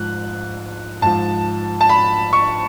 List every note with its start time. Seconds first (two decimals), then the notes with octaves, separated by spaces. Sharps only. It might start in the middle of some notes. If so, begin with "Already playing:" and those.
Already playing: G#2 F3 F#6
1.02 G#2 F3 A5
1.81 A5
1.89 B5
2.33 C#6